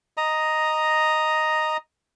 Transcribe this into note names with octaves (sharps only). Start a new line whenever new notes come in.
D#5 A#5